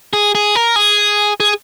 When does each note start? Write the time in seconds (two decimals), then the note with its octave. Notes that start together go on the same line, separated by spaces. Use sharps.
0.13 G#4
0.35 G#4
0.55 A#4
0.76 G#4
1.40 G#4